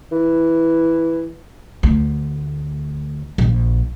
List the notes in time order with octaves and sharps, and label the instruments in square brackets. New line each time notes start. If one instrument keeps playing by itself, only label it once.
[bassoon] E3
[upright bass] D2
A#1